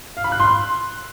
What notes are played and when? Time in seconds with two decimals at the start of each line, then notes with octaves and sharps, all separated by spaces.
0.17 F5
0.24 B5
0.32 F#6
0.40 C6